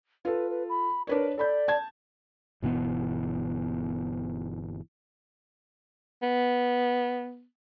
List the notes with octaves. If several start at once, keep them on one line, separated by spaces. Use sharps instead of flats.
F4 A4 B4
B4
B5
D4 A#4 B4 C#5
A4 D5 B5 G6
A5 G#6
G1 B2 E3 B3
B3